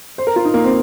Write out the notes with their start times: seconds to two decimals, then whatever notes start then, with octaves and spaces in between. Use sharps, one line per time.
0.18 C5
0.27 A#4
0.36 F4
0.45 D#4
0.54 A#3
0.64 C4